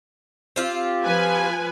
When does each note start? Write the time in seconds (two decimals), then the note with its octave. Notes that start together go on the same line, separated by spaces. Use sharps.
0.56 C4 F4 G4
1.03 F3 B4 G#5